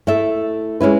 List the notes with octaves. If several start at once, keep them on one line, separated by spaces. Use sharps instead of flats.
A3 E4 A4 E5
G#3 C#4 E4 B4